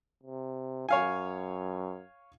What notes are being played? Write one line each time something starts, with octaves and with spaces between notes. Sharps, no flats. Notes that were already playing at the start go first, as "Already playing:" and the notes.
C3
F#2 C#5 F5 G#5